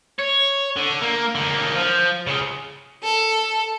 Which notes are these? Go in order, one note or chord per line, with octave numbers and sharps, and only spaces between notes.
C#5
D3
A#3
D3 A#3
F3
C#3 G#3
A4